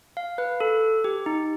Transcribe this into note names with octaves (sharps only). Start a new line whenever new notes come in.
F5
B4
A4
G4
D#4